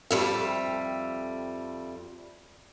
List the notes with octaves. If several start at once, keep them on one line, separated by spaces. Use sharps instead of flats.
F2 G3 E5